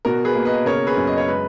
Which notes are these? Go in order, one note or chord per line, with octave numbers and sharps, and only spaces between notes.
B2 F#4 A#4
G#4 B4
A#3
B4 D#5
C#3 A#4 C#5
G#4 B4
F#2
D#5
C#5
G#3 B4